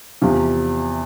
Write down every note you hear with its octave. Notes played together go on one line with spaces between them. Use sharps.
E2 C3 F3